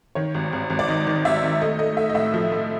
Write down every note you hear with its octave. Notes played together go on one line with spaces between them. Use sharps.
D#3 C#5
G#1
G#1
G#1
D5
D#3 D#5
D#3
G#1 E5
D#3
A3 D#5
A3 D#5
A3 E5
D#5
A2 E5
F3
A3